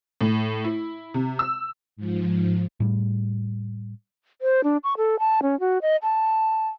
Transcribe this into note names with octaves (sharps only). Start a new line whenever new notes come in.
A2
E4
C3
E6
G#2 F3
A2 G3
C5
D4
C#6
A4
A5
C#4
F#4
D#5
A5